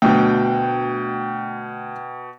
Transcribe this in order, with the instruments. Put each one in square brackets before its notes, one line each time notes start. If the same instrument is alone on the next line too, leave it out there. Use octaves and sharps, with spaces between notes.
[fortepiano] D2 F#3 [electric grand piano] B2 G5